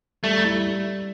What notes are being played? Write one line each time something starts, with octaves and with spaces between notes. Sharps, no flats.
G3 A3
E4